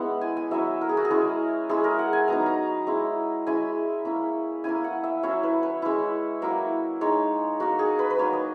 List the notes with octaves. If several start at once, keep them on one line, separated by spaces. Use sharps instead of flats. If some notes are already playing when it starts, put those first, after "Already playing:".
Already playing: G#3 B3 C#4 E4 F#5
G#5
G#5
F#3 C#4 E4 E5
A#4
G#4
F#4
G#4
G#3 C#4 E4
G#3 C#4 E4 G#4
A#4
F#5
G#5
F#3 B3 D#4 A#5
A#5
G#3 C#4 E4
G#3 C#4 E4 G#5
A#3 C#4 E4
A#3 C#4 E4 G#5
F#5
E5
F#3 C#4 E4 C#5
B4
B4
G#3 C#4 E4
F#3 A#3 E4
G#3 D#4 C#5
A#3 D#4 F#4
G#4
B4
B4
F#3 A#3 D#4 C#5
D#5